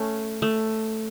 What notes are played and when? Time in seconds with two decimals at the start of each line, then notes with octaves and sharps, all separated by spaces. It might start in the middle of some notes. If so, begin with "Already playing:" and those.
Already playing: A3 C#4
0.42 A3